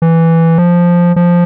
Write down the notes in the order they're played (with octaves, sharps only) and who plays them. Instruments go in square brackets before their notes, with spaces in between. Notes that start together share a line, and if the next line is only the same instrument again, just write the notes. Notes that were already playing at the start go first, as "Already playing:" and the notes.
[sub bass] E3
F3
F3